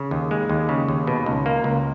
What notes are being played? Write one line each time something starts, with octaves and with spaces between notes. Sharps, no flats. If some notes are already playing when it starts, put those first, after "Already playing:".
Already playing: C#3
D#2
G#3
D#2
C#3
D#2
B2
C#2
A#3
C#2